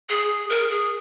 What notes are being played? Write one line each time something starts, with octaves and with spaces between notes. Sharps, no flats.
G#4
A#4
G#4